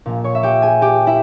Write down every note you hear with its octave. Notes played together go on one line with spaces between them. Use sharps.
A#1 A#2
C#5 C#6
E5
G4 G5
G#4 G#5
G4 G5
E4 E5